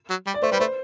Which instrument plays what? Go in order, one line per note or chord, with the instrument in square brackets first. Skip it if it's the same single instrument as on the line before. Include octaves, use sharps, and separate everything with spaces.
[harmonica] F#3
G3
[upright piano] D5
[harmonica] A3 [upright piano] C5
[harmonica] G3 [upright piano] B4
[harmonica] A3 [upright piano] C5